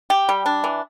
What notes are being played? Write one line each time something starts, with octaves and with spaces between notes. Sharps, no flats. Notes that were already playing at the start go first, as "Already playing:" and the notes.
G4
G3
D4
E3